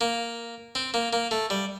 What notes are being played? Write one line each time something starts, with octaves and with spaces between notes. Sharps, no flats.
A#3
C4
A#3
A#3
A3
G3